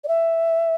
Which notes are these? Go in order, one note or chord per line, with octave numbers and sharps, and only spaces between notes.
D5
E5